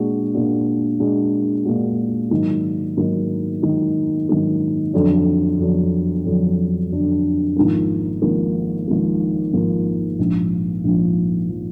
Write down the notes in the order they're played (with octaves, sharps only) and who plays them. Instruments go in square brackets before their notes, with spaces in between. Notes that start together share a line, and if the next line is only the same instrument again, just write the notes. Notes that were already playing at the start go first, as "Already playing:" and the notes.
Already playing: [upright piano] A#2 G#3 D4 F#4
A#2 G#3 D4 F#4
A#2 G#3 D4 F#4
A#2 G#3 D4 F#4
G#2 D#3 F#3 A#3 D#4
G#2 D#3 F#3 A#3 D#4
G#2 D#3 F#3 A#3 D#4
G#2 D#3 F#3 A#3 D#4
F2 D3 F#3 D4
F2 D3 F#3 D4
F2 D3 F#3 D4
F2 D3 F#3 D4
G#1 G#2 F3 A#3
G#1 G#2 F3 A#3
G#1 G#2 F3 A#3
G#1 G#2 F3 A#3
A#1 G#2 F3
A#1 G#2 F3
F3